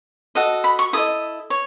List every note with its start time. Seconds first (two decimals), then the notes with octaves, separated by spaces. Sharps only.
0.35 F#4 A4 D#5
0.64 B5
0.79 C#6
0.93 E4 A4 D#5 D#6
1.50 C#5